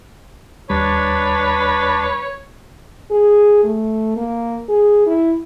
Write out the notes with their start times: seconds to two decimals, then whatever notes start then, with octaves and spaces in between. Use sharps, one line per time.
0.70 D#2 G3 D4 B4 C#5
3.11 G#4
3.63 A3
4.16 A#3
4.69 G#4
5.06 E4